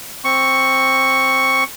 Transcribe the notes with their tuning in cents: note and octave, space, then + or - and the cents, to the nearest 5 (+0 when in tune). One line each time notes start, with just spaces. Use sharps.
C4 +10 C#6 +0